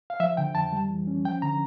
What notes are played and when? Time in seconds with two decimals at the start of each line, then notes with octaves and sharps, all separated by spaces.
0.10 F5
0.20 F3 E5
0.37 D3 G5
0.55 F2 A5
0.72 G3
0.90 E3
1.07 C#4
1.25 F3 G5
1.42 D3 A#5